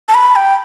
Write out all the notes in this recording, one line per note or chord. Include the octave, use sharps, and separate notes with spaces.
A5
B5
G5